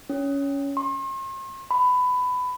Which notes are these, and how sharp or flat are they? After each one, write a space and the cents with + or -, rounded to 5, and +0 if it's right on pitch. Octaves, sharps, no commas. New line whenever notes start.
C#4 +15
C6 +45
B5 +20